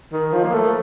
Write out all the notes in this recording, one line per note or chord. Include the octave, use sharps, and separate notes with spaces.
D#3
F3
A#3
A3